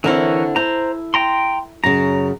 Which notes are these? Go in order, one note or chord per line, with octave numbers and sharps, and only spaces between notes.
D3 E3 C4 E4 A#4 C#5
E4 C5 A#5
G5 A#5 C6
F#2 C#3 A#5